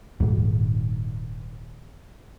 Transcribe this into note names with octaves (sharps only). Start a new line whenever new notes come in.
D#1 G#2